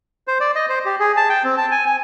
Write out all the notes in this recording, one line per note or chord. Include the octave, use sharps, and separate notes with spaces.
C5
D5
D#5
C5
G4
G#4
A5
G5
C4
A5
G#5
G#5